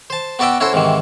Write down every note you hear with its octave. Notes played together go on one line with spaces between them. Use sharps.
C5 A5
B3 F#4 D5 E5 G5
C#4 E4 F#4 A4 C5
G#2 C3 D#3 E3